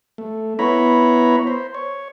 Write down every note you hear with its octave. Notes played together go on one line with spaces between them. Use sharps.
A3
B3 E4 C#5 A#5 B5
C5
C#5